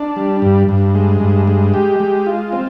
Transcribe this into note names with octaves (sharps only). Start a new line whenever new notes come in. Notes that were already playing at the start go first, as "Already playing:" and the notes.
Already playing: D4
G3
G2
G2
G#3
G2
G#3
G4
G#3
F4
C4